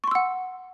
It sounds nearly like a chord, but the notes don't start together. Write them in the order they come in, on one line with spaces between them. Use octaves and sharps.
C#6 C6 E6 F#5